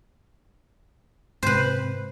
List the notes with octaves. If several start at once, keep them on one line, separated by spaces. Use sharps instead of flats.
G#2 C3 B4 C5